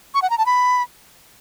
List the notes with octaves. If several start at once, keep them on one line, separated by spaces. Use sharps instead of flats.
C#6
F#5
A#5
A5
B5